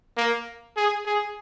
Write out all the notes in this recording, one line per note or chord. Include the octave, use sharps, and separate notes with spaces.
A#3
G#4
G#4